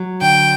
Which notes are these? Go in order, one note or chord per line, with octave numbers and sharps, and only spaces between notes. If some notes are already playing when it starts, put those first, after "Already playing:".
Already playing: F#3
D3 G5